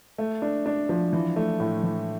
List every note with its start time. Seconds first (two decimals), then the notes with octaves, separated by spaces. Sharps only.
0.18 A3
0.42 D4
0.66 D4
0.89 F3
1.13 E3
1.36 A3
1.60 A2
1.83 E3